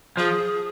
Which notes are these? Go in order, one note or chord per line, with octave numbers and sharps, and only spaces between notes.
F3 G#4